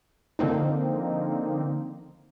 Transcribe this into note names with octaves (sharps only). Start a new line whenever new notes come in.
D3 F3 A#3 C4 D#4